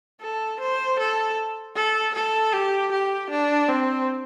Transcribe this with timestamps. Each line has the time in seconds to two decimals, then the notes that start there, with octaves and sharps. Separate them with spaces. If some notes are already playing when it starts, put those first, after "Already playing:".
0.21 A4
0.61 C5
0.99 A4
1.76 A4
2.14 A4
2.53 G4
2.92 G4
3.30 D4
3.69 C4